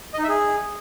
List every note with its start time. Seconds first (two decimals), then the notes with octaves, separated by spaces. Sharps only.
0.14 D#5
0.19 D#4
0.24 E5
0.29 G#4